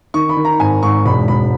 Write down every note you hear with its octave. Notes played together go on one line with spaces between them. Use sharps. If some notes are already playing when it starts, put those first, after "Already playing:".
D#3 C#6
B5
D#3
A#5
G#1 G#5
G#2 C#6
E1 B5
E1 B5